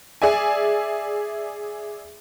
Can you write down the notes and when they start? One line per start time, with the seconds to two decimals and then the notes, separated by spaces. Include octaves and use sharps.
0.22 G#4 D5 E5 G#5